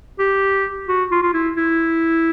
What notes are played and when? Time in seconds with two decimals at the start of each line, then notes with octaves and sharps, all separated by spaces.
0.19 G4
0.89 F#4
1.11 F4
1.23 F4
1.34 E4
1.57 E4